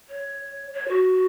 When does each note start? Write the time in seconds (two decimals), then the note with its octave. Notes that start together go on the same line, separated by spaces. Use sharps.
0.09 C#5
0.73 C#5
0.88 F#4